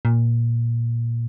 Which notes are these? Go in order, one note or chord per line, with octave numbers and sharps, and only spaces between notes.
A#2